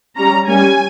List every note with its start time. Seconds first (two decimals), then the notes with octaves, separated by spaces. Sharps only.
0.17 G3 C#4 A#5
0.47 G3 A#3 C#4 G#5